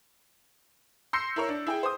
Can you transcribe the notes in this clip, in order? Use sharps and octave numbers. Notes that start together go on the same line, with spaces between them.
C6 E6 G6 A#6 C7 C#7
E4 A#4 C#5
D4
E4 G#4 G5
C5 D#6